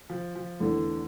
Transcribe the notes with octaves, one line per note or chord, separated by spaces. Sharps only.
F3
F3
E2 D3 E3 A3